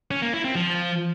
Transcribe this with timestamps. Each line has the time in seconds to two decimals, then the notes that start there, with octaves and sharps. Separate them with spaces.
0.11 C#4
0.22 A#3
0.33 E4
0.44 C4
0.56 F3